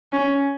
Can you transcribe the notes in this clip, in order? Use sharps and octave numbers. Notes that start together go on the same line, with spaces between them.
C#4